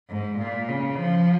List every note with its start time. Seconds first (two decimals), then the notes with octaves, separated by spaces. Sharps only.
0.09 G#2
0.39 A#2
0.68 C#3
0.97 F3